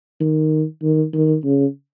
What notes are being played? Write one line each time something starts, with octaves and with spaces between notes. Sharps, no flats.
D#3
D#3
D#3
C#3